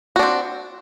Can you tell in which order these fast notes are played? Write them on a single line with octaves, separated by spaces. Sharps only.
F#4 D4 C4